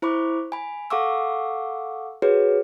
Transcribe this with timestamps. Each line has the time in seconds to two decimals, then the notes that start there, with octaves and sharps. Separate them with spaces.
0.02 E4 C5 B5 C#6 D6
0.52 G#5 B5
0.90 A4 F5 F#5 C#6 D6 E6
2.22 F#4 G#4 B4 C#5